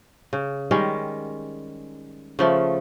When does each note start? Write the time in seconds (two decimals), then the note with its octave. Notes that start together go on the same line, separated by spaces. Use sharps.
0.33 C#3
0.71 D#3 G3 G#3 C#4
2.39 C#3 F3 A3